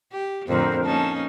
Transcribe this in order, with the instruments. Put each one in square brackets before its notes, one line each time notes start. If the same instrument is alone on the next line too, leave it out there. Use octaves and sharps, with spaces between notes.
[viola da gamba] G4
[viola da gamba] F2 A2 D3 [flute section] A#4 C5
[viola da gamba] A#3 C#4 D#4 [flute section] A5